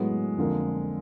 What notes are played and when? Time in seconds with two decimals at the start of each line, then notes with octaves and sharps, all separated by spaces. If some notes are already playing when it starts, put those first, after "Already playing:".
Already playing: A2 F#3 G#3 B3
0.38 F2 D3 F3 A#3